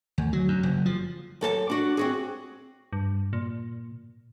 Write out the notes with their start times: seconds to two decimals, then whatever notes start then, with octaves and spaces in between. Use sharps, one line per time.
0.18 D2
0.33 F#3
0.48 F#2
0.63 F#1
0.86 F3
1.41 F#2 A4 A#4 A5
1.70 D4 F#4
1.97 C4 F#4 G#4
2.93 G2
3.33 A#2